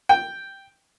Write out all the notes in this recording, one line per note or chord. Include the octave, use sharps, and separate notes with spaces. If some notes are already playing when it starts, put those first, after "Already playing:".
G5